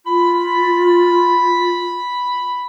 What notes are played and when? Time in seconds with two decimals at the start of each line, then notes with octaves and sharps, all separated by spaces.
0.06 F4 B5